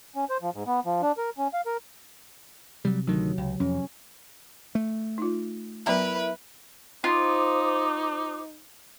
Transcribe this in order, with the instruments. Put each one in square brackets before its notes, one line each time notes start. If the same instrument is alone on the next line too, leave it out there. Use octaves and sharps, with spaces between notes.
[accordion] C#4
C5
F3
G#2
B3
F3
D4
A#4
C#4
F5
A#4
[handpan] C3 [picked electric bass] F#3 G3
[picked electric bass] D2 D#3 [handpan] F#3
[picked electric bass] C#2
[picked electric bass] F2 [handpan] C#4
[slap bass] A3
[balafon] D#4 F4
[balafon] F#3 B3 A#5 [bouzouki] E4 A#4 [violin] B4
[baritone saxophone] D#4 [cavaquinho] F4 [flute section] C5 D6 D#6